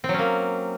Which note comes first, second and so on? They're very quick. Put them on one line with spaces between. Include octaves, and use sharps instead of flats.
C4 F#3 C#4 A#3